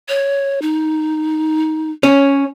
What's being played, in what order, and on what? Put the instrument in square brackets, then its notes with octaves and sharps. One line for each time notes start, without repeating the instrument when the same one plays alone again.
[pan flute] C#5
D#4
[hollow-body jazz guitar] C#4 [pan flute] C#5